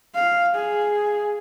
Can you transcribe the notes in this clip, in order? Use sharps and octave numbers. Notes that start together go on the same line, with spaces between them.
F5
G#4